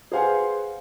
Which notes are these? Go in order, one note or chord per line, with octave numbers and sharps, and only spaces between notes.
G#4 B4 C5 F5 F#5 G#5